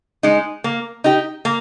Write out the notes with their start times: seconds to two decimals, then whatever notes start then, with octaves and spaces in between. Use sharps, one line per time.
0.23 G#3 D#4
0.64 A#3
1.04 D#4 G4
1.45 A#3